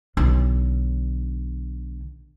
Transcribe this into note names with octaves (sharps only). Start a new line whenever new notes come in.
B1 D3